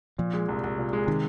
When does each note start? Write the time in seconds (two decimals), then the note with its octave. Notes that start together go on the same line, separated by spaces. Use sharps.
0.18 A#2 F3
0.34 G#3
0.49 C2
0.64 C2
0.78 A#2
0.93 G#3
1.07 C3 D#3